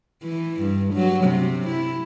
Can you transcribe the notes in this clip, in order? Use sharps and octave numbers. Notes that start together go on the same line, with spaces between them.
E3
G2
F#3
C3
E4